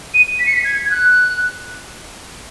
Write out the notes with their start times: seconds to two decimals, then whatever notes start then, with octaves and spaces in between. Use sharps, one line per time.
0.14 D#7
0.39 B6
0.46 C#7
0.54 B6
0.64 G#6
0.85 G#6
0.91 F#6